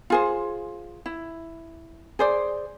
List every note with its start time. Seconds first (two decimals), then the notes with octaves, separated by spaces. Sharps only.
0.10 F4 G#4 C5
1.06 E4
2.19 G#4 C5 D5